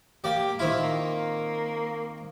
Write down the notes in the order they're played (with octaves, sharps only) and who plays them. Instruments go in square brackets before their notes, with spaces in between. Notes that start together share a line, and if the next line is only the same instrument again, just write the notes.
[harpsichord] A#3 D5 [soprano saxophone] G4
[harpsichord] D#3 C4 F4 [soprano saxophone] E4
[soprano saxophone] A#3